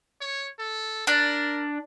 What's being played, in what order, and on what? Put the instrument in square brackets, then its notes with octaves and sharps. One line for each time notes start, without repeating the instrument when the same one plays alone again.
[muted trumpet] C#5
A4
[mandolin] D4 [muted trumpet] A#4